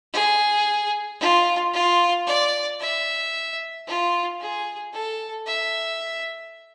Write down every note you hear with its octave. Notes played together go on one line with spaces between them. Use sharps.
G#4
F4
F4
D5
E5
F4
G#4
A4
E5